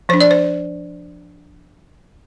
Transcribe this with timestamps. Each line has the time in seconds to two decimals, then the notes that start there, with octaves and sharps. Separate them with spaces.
0.09 F3 D4 C5
0.21 D5
0.31 C5